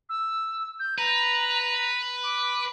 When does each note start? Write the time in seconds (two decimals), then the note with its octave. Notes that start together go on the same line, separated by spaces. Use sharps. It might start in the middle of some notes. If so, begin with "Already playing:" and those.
0.09 E6
0.80 G6
0.98 B4 A#5
2.24 D6